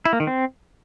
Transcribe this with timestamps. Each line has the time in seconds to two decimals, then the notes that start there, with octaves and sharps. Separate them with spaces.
0.05 E4
0.13 A#3
0.20 D#3
0.27 C4